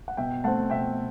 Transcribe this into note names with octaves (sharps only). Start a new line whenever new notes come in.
F#5
B2 E5 G5
A3 C4 F#5 A5
B2 E5 G5